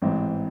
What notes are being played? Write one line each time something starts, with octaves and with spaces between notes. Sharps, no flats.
A1 G#2 E3 C4